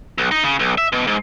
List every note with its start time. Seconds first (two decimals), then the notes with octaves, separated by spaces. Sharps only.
0.18 B1
0.31 D#4
0.44 C#3
0.59 B1
0.78 E5
0.92 B2
1.07 G#2